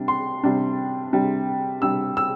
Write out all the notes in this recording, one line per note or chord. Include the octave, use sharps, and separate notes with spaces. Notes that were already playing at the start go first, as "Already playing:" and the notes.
Already playing: C3 G3 D4
C6
C3 G3 D4
C3 G3 D4
C3 G3 D4 E6
E6